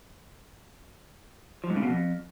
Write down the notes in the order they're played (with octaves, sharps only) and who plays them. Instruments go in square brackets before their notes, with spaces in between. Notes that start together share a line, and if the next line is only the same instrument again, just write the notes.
[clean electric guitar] F3
G#2
C#3
B2
F2